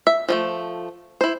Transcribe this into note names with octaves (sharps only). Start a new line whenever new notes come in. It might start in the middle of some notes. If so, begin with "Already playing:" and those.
E5
F3 G3 A3
E4 C5